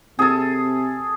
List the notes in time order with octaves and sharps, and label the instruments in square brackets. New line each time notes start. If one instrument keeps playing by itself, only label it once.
[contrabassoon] C3 [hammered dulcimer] G#4 A4